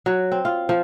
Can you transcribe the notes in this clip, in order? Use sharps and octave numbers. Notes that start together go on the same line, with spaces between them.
F#3
C4
F4
F3